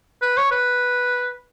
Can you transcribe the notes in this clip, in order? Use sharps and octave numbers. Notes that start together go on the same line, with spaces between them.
B4
C#5
B4